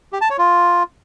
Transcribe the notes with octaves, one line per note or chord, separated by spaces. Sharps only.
G4
A5
C#5
F4